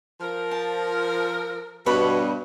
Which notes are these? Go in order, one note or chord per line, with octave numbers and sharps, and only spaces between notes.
F3 A#4
A5
G2 B2 B4 C#5 B5